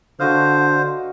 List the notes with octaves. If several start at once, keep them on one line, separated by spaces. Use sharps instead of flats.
D3 F#4 C5 D#5 F5